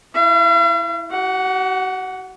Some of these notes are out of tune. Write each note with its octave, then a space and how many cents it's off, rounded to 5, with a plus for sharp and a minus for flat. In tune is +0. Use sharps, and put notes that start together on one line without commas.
E4 +0 F5 -45
F#4 +45 F#5 +0